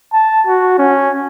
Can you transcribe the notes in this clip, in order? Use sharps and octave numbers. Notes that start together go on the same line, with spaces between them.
A5
F#4
C#4